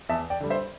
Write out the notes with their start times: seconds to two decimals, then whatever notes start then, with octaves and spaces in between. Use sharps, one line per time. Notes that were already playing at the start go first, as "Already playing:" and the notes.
0.09 E2 E5 A5
0.30 D5 G5
0.40 D3 G3
0.50 C5 E5